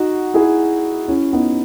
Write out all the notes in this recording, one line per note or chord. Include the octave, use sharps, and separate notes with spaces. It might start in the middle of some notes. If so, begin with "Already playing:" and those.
Already playing: D#4 F#4
E4 G#4
C#4 E4
B3 D#4